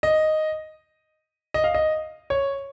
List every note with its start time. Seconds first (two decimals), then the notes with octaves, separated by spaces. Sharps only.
0.03 D#5
1.54 D#5
1.64 F5
1.74 D#5
2.30 C#5